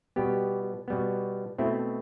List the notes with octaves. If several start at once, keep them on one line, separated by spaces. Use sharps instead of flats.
B2 G3 B3 G4
B2 G3 B3
B2 A3 C4 E4